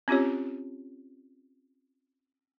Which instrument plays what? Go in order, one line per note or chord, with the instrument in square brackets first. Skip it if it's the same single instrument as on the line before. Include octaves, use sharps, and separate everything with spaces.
[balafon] C4 C#4 F4 G4 C#5